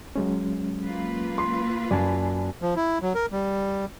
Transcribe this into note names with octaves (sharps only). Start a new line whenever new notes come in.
F#3 G#3 C#4
A#3 F4 B4
C6
F#2 D5 G#5 A5
F3
E4
F#3
A#4
G3